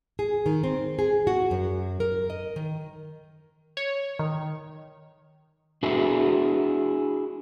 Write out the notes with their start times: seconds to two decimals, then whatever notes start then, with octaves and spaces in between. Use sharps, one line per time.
0.19 G#4
0.46 D#3
0.64 C4
0.99 G#4
1.27 F#4
1.51 F#2
2.00 A#4
2.30 D#5
2.56 D#3
3.77 C#5
4.19 D#3
5.83 D4 E4 F#4 G#4